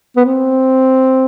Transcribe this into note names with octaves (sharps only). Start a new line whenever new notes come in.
B3
C4